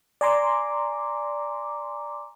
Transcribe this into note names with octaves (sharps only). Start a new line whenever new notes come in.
D5 G#5 A#5 C6 D6